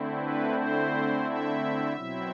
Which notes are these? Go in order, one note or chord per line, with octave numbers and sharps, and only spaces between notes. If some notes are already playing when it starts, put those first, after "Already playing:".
Already playing: D3 A3 C4 E4
B4
C5
E5
B2 F#3 C4 E4